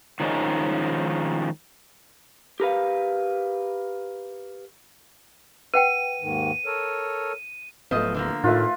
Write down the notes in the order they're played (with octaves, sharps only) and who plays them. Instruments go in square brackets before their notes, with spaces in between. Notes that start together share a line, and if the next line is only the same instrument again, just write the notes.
[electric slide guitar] D#3 F3 G#3 C#4 D#4
[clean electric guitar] G4 A#4 B4 F5
[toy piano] B4 F#5 G5 [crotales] D#7
[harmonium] D#2 G#2 D#3
A4 A#4 C#5
[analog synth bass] D1 [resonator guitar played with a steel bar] F3 D#5 [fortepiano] A3 B3
[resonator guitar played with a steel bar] D3 F3 A#3
[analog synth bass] A2 [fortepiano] D#3 A3 [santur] F4 B4 E5